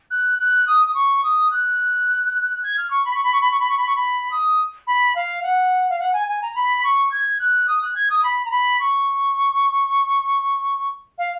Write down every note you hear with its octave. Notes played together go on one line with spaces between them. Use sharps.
F#6
F#6
D#6
D#6
C#6
D#6
F#6
G#6
F6
C#6
B5
C#6
B5
C#6
B5
C#6
B5
C#6
B5
C#6
B5
D#6
B5
F5
F#5
F5
F#5
G#5
G#5
A#5
B5
C#6
G#6
F#6
D#6
F#6
G#6
D#6
B5
A#5
B5
C#6
F5